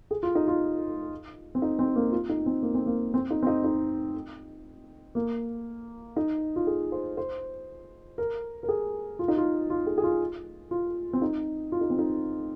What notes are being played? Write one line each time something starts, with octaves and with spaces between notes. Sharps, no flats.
G#4
F4
D#4
F4
C4
D#4
C4
A#3
F4
D#4
C4
A#3
C4
A#3
C4
D#4
C4
D#4
D#4
A#3
D#4
F4
G#4
C5
C5
A#4
A#4
G#4
F4
D#4
F4
F4
G#4
G#4
F4
F4
C4
D#4
F4
D#4
C4
D#4